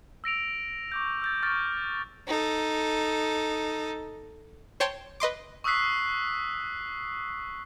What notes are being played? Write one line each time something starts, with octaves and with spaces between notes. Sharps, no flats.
E6 A#6 D7 F7
C#6 D6 G6
E6 G6 A6
C#6 F6 A6 D7
D#4 A4
C5 C#5 G5 A5 C6
B4 D#5 C6 D6
C#6 D#6 E6 F#6 B6 C7